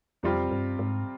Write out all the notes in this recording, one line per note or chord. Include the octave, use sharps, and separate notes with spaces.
F2 C3 G3 C4 F4
G2
G#2